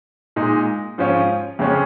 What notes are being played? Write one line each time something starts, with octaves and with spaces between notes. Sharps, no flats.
A#2 G#3 D#4
G#2 F3 C#4 F4
F2 C#3 G#3 C#4